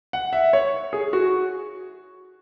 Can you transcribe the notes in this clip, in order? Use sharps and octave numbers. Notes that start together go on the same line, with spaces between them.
F#5
E5
C#5
G#4
F#4